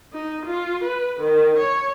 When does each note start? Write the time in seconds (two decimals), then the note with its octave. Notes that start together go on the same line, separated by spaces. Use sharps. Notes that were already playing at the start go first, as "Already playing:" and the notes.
0.13 D#4
0.45 F4
0.83 B4
1.20 D#3
1.58 C#5